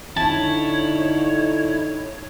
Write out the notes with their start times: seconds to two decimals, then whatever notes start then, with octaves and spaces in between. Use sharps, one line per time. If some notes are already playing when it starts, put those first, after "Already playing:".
0.17 D3 D#4 E4 C#5 A5